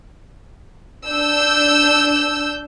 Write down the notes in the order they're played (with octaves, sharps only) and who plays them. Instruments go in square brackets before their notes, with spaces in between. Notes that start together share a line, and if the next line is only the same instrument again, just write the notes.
[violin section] D4 E6 G6